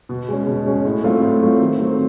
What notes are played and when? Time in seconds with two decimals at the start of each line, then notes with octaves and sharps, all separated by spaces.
0.09 B2
0.28 G#3 C#4
0.47 B2
0.66 G#3 C#4
0.85 A2
1.04 F#3 A3 C4 F4
1.22 A2
1.42 F#3 A3 C4 F4
1.60 D#3
1.80 F#3 A3 C4